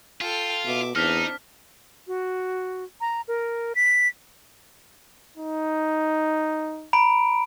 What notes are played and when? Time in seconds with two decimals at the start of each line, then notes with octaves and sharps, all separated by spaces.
0.21 F4 A4 G5
0.65 B2 E5 D6
0.96 E2 C4 D4 D#4 F6 B6
2.07 F#4
3.01 A#5
3.28 A#4
3.75 B6
5.37 D#4
6.93 A#5 B5 D7